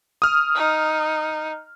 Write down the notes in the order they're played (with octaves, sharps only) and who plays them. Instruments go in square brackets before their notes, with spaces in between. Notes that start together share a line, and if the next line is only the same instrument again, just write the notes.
[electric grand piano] D#6 F6
[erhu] D#4